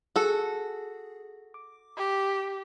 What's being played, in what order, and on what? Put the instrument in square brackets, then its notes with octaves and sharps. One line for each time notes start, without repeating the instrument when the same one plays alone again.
[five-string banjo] F#4 A4 [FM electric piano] G#4
[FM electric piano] D6
[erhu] G4